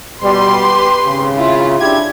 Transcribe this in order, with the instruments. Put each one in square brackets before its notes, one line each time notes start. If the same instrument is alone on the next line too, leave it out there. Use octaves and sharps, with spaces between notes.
[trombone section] B2 G3 [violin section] G4 B4 C6
[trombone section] G#1 C#3
[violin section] E4 F4
[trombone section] D4 E4 G4 [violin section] G#6